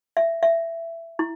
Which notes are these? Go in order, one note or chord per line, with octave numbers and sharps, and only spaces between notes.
E5
E5
E4